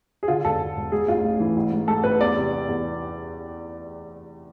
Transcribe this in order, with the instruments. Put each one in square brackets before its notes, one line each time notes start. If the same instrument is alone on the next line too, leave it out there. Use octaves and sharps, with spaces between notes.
[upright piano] G#4
D3 F4
E1 A4
E1
E1
G#2 G#4
A1 F4
A1
E3
A1
G#2
G#2 A4
A1 B4
E2 D5
C3
C3
E2